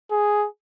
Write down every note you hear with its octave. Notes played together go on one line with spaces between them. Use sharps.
G#4